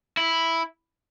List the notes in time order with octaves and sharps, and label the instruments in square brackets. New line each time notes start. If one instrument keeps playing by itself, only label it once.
[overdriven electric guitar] E4